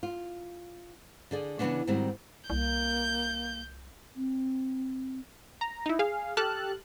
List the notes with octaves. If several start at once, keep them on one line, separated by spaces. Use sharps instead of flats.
F4
D3 G#4 D5
C#3 E3 A#3 B3 C#4 D4
G#2 D#3 G3 C4 F#4
C2 A#3 G6
C4
A#5
D#4 E4
G#4 F5 G#5
G4 A4 A5 F6 F#6